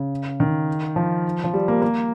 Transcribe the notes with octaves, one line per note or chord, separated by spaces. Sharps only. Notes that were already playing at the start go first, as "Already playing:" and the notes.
Already playing: C#3
D#3
F3
F3
G3
A#3
A#3